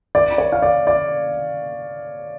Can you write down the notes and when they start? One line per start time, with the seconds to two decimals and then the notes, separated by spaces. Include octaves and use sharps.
0.15 D5
0.38 C#5
0.52 F5
0.62 D5
0.87 D5